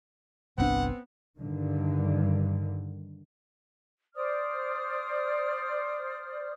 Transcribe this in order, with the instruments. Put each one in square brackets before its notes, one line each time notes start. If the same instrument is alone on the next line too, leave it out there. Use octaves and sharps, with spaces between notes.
[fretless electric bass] G1 C2 D4 [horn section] B3 C4 [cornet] F#5
[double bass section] G2 D3 D#3
[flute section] C5 D5 D#6 F6